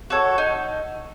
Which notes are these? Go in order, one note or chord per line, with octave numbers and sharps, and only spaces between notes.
F#4 A4 C#5
D#4